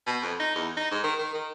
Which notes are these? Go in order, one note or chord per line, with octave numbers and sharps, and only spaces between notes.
B2
F2
D#4
E2
D#4
G#2
D#3
D#3
D#3